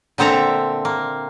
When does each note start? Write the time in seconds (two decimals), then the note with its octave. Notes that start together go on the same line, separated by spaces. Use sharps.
0.18 A#2 D3 C4 A4 E5 A#5
0.85 A#3